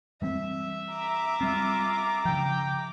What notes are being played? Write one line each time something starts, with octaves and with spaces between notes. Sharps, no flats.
E3 G3 C4 E5
A#5 D6
G3 C4 F4
C#3 F3 G5